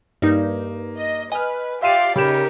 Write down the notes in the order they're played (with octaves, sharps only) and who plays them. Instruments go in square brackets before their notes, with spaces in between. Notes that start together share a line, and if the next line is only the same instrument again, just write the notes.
[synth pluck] G2 D#4 [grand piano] A#3
[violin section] D#5
[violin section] B4 [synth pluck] D#5 F6 [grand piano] G#5
[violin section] F4 G4 D5 [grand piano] E5 C6 D#7 [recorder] F5
[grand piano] C#3 E7 [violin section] D#4 A#4 [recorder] G4 [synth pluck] B5